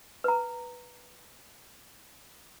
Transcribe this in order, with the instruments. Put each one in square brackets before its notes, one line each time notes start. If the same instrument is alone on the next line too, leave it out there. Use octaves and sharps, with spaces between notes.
[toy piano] B4 A#5